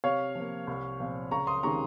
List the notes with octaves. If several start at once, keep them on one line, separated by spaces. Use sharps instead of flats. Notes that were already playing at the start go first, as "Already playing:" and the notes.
C3 C#5 F5
F3 A#3
C2
A#2 F3 C4
C#2 A#5 C#6
C6 D#6
C3 D#3 G#3 C#4 A#5 C#6